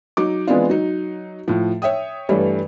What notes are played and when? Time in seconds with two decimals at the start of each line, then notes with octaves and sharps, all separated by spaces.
0.17 F#3 D#4 D6
0.47 E3 G#3 B3 C4 D4 F4
0.70 F#3 D#4
1.48 A2 F3
1.82 C#5 E5 G5 D#6
2.29 G2 E3 G3 A3 C#5